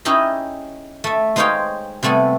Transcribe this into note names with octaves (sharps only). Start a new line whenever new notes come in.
C#4 D#4 E4 G4 G#4 D#5
A3 E5
G#3 D#4 C5 C#5 F5 G5
C3 G3 A3 B3 G#5